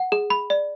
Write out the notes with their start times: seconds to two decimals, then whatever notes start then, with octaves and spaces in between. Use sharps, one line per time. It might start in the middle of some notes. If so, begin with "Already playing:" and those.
Already playing: F#5
0.12 G#4
0.30 B5
0.50 D5